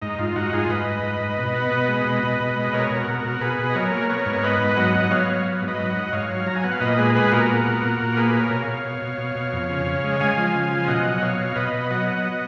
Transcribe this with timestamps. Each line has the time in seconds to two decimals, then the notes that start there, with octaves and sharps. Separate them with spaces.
0.02 G#2 D#4
0.19 G#2 F4
0.36 G#2 D#4 F#4
0.53 G#2 F4 G#4
0.69 G#2 B4 D#5
0.86 G#2
1.03 G#2
1.20 G#2
1.38 B2
1.55 B3
1.71 B2
1.88 G#3
2.05 B2
2.23 B2
2.40 B2
2.56 G#3
2.73 B2 A#4 C#5
2.91 B2
2.97 F#4 A#4
3.08 B2
3.19 F#4 A#4
3.24 B2
3.41 B2 G#4 B4
3.59 B2
3.70 D#5
3.75 F#3 A#4 C#5
3.92 A#3
4.09 B3 A#4 C#5
4.26 G#2
4.43 B3 B4 D#5
4.61 G#2
4.77 F#3 D#5 F#5
4.95 B3
5.11 F#3 C#5 F5
5.28 F#3
5.45 B3
5.62 G#2
5.68 B4 D#5
5.79 F#3
5.90 D#5 F#5
5.96 G#2
6.12 G#2 C#5 F5
6.30 F#3
6.46 F#3 A#5
6.56 G#5
6.64 B3 F#5
6.72 F5
6.81 A#2 B4 D#5
6.97 G#3 G#4 B4
7.15 B3 G#4 B4
7.32 A#2 F#4 A#4
7.49 B3
7.65 A#2
7.82 A#2
8.00 A#2
8.16 A#3 G#4 B4
8.34 A#3
8.39 A#4 C#5
8.50 B2
8.62 C#5 F5
8.68 B2
8.84 B2
9.02 B2
9.18 B2
9.36 B2
9.53 F2
9.70 C#3
9.86 C#3
10.04 G#3
10.20 G#3 F5 G#5
10.37 F3
10.54 C#3
10.71 F3
10.88 B2 D#5 F#5
11.05 F#3
11.22 B2 C#5 F5
11.39 B2
11.55 B2 B4 D#5
11.73 B2
11.91 F#3 D#5 F#5
12.07 B3